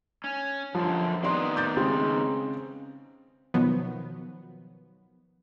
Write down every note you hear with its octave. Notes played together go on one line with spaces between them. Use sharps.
C#4
F#2 D3 F3
D#3 B3 C4 D5 C6
D6 G6 A6
C#3 G#3 C4
B2 D#3 F3 F#3 B3